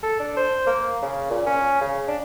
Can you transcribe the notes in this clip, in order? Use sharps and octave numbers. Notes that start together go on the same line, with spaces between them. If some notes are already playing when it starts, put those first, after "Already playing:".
A4
D4
C5
A#3
C#3
A#2
C#4
C#3
D4